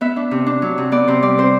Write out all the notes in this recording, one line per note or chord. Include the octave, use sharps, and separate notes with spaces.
B3 E5
D4
C3
D4
F#3
C3
B3 D5
C3 C5
G3 D5
C4 C5